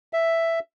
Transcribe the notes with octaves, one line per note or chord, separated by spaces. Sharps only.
E5